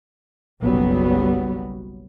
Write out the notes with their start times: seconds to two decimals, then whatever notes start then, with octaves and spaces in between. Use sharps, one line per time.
0.62 F#1 B1 F#3 G3 B3